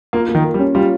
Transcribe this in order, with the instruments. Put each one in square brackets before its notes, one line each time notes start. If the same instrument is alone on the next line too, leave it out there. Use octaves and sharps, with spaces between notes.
[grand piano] A#3 [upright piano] F4
[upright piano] A#3
[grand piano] D#3
[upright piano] A#4
[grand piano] G3
[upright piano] C#4
[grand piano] G3 [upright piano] F4